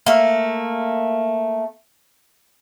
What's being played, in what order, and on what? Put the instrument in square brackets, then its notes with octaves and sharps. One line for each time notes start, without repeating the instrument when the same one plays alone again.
[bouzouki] A3 A#3